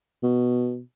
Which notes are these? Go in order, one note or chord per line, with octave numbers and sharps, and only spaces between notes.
B2